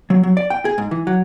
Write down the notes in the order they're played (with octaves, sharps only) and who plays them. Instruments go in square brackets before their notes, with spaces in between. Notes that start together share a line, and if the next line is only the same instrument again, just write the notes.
[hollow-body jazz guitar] F#3
F#3
D5
G5
G#4
G#2
E3
F#3